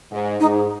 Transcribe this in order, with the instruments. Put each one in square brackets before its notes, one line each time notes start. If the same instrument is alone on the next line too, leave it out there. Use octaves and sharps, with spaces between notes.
[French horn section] G#2
[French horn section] G#2 [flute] D#4